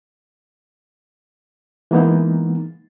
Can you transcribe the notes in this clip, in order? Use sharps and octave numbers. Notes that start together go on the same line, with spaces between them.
E3 G#3 A#3 B3 D#4